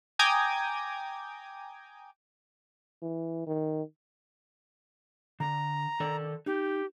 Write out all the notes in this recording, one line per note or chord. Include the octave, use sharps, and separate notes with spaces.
G5 G#5 A#5 D6 D#6 G#6
E3
D#3
D3 A#5
D#3 A4 D5
D#4 G4